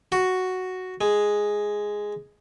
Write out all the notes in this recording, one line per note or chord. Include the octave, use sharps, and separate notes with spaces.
F#4
G#3